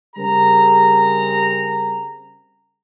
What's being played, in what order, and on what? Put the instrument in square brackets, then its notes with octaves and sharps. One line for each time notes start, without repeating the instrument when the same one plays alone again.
[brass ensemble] C#3 G3 C4 G#4 A#4 A#5